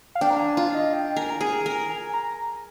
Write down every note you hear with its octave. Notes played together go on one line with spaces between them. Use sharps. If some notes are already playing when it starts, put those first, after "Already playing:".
F5
D4 G5
A#5
G#5
F4 F5
D#5
G5
A#4 G#5
A#5
G#4 G#5
A#4 G#5
G#5
A#5